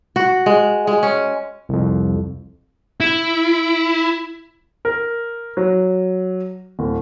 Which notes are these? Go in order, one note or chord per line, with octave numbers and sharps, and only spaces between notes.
F#4
G#3
G#3
C#4
C2 F2
E4
A#4
F#3
D1